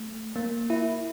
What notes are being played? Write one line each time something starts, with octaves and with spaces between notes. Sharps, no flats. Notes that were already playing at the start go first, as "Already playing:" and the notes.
Already playing: A3
A#3
E4